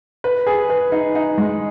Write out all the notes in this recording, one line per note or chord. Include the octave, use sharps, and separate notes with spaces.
B4
G#4
B4
D#4
D#4
G#3